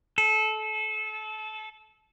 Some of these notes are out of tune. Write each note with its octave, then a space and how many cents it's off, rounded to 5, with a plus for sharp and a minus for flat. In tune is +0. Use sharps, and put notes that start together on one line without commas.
A4 -25